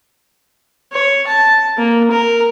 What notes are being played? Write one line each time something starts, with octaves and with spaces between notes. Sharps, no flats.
C#5
A5
A#3
A#4